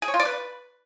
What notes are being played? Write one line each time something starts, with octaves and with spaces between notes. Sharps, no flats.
G#4
C#5
F4
D5
B4